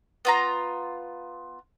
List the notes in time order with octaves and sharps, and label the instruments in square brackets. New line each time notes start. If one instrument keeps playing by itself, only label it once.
[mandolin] B3 F4 A#5